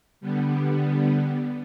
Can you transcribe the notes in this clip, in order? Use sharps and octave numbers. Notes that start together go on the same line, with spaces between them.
D3 G3 B3